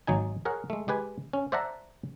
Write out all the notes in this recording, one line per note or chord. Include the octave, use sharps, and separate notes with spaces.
G#1 F#3 D#4 G#5
G#4 A#4 C#5 F#5
G#3 A3
G#3 G4 B4 G#5
C#4
C5 D5 E5 F#5 A5 A#5